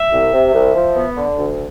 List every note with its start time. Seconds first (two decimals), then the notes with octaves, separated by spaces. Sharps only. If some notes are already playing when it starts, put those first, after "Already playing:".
Already playing: E5
0.12 C2
0.33 C3
0.54 C2
0.75 F3
0.96 B3
1.17 D3
1.38 D2